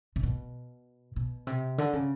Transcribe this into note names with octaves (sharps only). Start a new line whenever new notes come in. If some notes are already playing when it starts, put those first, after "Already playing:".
C3
B2
B2
C3
D3
C#3